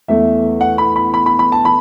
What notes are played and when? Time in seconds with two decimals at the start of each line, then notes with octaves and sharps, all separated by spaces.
0.08 E2 E3 A3 E5
0.61 F#5
0.78 B5
0.96 B5
1.14 B5
1.26 B5
1.39 B5
1.52 A5
1.65 B5